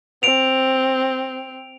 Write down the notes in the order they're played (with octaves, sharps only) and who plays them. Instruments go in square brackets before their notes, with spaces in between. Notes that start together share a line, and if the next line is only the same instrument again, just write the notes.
[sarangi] C4 [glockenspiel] D7 F7